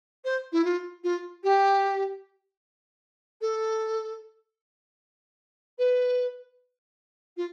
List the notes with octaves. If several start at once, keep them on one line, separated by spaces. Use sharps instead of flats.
C5
E4
F4
F4
G4
A4
B4
F4